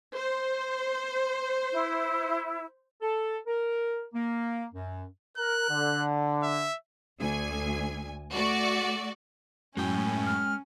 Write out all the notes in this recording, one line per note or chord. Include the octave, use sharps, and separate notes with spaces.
C5
E4
A4
A#4
A#3
F#2
A#4 F#6
D3
E5
D2 G#5
A3 F#4 D5
F#2 A2 G#3 C#4 G5
F6